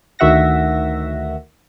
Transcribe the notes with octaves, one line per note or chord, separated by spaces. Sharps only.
D2 D#3 F#4 E5 F#5 A#6